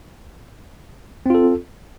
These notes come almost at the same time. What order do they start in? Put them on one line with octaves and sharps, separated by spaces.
C4 F4 A4